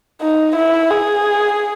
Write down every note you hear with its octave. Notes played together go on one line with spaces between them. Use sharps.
D#4
E4
G#4